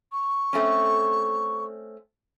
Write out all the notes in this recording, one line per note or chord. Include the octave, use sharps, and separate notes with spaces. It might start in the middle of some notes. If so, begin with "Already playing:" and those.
C#6
A3 C4 C#4